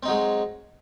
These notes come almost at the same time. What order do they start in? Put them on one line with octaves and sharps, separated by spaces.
C4 D#4 F#3 G#3